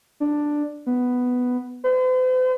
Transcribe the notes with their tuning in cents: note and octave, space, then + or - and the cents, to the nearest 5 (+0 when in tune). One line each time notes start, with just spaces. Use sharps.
D4 +5
B3 +5
C5 -45